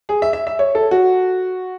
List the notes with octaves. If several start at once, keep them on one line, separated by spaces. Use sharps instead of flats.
G#4
E5
E5
E5
C#5
A4
F#4